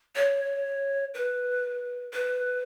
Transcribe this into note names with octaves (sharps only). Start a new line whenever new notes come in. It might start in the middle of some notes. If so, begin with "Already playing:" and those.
C#5
B4
B4